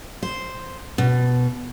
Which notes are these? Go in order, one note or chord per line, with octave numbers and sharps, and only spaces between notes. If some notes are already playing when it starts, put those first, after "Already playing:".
C5
B2